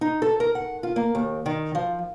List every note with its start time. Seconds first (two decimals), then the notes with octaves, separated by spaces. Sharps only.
0.01 D#4
0.22 A4
0.40 A#4
0.55 F#5
0.83 F4
0.96 A#3
1.15 D#2
1.46 D#3
1.75 F3